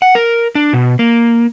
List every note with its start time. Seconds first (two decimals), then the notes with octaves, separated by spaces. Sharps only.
0.02 F#5
0.15 A#4
0.55 D4
0.73 B2
0.99 A#3